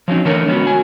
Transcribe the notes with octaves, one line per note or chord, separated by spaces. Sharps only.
F3 F#3 C4 C#4 D#4
D3 E3 A3 A4 A#4 C#5
G#3 B3 C#4 F4 F#4
F#4 G#5